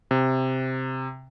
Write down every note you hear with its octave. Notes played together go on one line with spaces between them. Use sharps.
C3